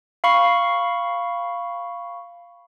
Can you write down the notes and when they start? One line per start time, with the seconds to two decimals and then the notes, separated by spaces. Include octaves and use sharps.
0.24 F5 B5 C#6 C7